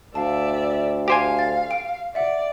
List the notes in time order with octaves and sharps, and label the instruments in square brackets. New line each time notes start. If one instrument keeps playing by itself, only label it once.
[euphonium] D2 [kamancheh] D5 E5 [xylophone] F5 A5
[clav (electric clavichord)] G4 C5 G#5 [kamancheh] F5
[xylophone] A6
G5 D7
[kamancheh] D5 [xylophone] E5 F#5